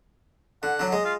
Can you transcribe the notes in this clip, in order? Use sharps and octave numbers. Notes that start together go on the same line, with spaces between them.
D3 F#5
D3 F#3
G#3 D#5
F4